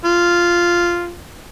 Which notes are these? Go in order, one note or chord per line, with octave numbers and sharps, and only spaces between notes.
F4